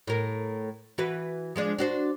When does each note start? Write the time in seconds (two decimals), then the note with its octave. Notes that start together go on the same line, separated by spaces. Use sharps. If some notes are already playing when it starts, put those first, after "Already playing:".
0.07 A2 A#4
0.98 E3 F#4 B4
1.56 F3 G#3 D4
1.79 D4 F#4 C5